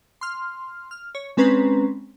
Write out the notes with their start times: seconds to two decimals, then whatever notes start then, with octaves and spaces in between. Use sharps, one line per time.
0.21 C6 F6
0.91 F6
1.15 C#5
1.37 G#3 C4 C#4 B4 A#5 C7